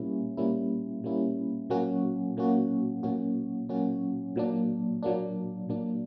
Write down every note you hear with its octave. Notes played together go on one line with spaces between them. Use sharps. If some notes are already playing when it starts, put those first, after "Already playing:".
Already playing: A#2 G3 A#3 C#4 E4
A#2 G3 A#3 C#4 E4
A#2 G3 A#3 C#4 E4
A#2 F#3 A#3 C#4 F#4
A#2 F#3 A#3 C#4 F#4
A#2 F#3 A#3 C#4 F#4
A#2 F#3 A#3 C#4 F#4
A#2 F#3 A#3 D4
A#2 F#3 A#3 D4
A#2 F#3 A#3 D4